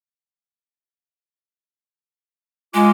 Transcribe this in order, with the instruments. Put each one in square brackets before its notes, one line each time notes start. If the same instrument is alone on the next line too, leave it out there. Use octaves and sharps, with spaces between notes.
[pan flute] G#3 [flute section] F4 G#5 D6